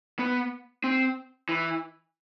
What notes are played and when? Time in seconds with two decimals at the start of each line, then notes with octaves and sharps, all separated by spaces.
0.19 B3
0.84 C4
1.49 E3